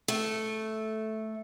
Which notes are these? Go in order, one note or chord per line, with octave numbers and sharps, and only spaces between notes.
A3